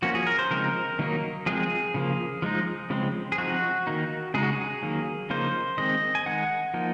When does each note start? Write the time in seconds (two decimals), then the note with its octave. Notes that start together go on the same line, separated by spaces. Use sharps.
0.02 F3 A#3 C#4 F#4
0.15 G#4
0.27 A#4
0.39 C5
0.51 C#3 F3 G#3 C4 D#4 A#4
0.99 D#3 F#3 A#3 D#4
1.46 F3 G#3 C4 G#4
1.94 C#3 F3 A#3
2.42 F3 G#3 D#4
2.90 C#3 F3 G#3 C4
3.32 G#4
3.38 F3 C4 D#4 F#4
3.87 D#3 A#3 D#4
4.34 C#3 G#3 D#4 G#4
4.43 F#4
4.52 G#4
4.82 D#3 F#3 A#3
5.30 C#3 F3 A#3 D#4 C5
5.78 D#3 G#3 C4 D#5
6.15 G#5
6.26 D#3 G#3 D#4 F#5
6.74 F3 A#3 D#4